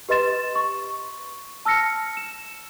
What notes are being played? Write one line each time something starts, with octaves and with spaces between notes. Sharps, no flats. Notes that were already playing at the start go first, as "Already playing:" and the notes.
G4 B4 D#5 C6 A6 E7
C#6
A5 E6 F6 A#6 C#7
E7